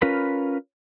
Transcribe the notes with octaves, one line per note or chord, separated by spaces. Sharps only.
C#4 F4 A#4 B4 B5